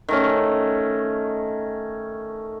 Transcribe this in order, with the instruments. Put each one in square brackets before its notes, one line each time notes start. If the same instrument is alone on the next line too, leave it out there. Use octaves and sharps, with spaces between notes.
[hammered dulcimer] D#3 A3 C#4